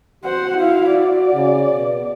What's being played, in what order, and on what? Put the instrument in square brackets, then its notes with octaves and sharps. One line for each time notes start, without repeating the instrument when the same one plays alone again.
[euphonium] F#4 [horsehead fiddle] C5 F#5
[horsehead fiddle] E4 F5
D5
[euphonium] C#3
B2